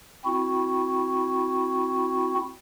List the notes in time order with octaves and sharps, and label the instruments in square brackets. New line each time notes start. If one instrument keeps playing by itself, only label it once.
[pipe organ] C4 E4 F#4